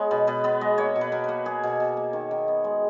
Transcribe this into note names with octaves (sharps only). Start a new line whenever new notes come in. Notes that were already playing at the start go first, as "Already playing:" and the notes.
Already playing: G#3 B3 C#5
B2 B4
B2 B4
B3 B4
G#3 D#5
A#3 C#5
B2
B4
B2 A#4
A#3 B4
A#3 G#4
B2
B2
A#3
D#3
D#3
B3
G#3